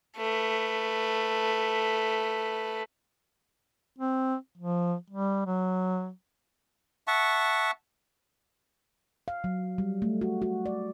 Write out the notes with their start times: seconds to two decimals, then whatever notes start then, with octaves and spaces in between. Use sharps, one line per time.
0.17 A3 B4
3.99 C4
4.58 F3
5.10 G3
5.46 F#3
7.07 E5 F#5 A5 C#6
9.28 F5
9.44 F#3
9.78 G3
10.02 A3
10.21 F#4
10.42 F#4
10.66 D5